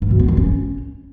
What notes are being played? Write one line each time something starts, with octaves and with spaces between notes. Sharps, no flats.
G2
B2
B3
G2
C#4